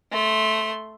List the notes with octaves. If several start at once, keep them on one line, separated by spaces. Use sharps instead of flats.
A3 C6